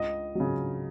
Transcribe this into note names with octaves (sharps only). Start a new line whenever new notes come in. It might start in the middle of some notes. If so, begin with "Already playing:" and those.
Already playing: C#2 D#5
C#3 F#3